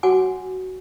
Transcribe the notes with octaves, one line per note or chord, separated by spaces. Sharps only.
F#4 C#5 F#5 G#5 D6